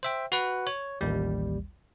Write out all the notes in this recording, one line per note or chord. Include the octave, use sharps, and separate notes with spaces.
C5 E5 G5
F#4 B4 F#5
C#5
A1 D#2 G3